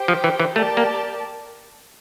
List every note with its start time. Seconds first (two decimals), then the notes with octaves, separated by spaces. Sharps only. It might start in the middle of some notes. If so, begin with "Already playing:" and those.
Already playing: G4 C5 G5
0.08 F3
0.24 E3
0.40 E3
0.55 A3 G4 A#4 D5 A5
0.77 A#3